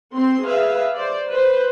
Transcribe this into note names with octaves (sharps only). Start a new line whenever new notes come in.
C4 C6
G#4 B4 E5 F5
C5 D5
B4 C5